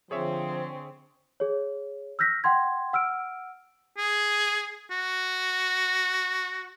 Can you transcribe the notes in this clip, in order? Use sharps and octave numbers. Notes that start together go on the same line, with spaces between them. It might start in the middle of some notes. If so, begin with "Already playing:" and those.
D3 F3 C4 G#4 C#5 E5
G#4 C#5
E6 F6 G6 A#6 B6
F#5 G5 C6 G#6
F#5 E6 F6 D7
G#4
F#4